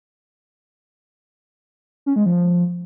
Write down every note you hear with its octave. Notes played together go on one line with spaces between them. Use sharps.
C#4
G#3
F3